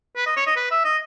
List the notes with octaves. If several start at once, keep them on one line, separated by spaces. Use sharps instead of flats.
B4
D#5
C#5
D#5
B4
E5
D#5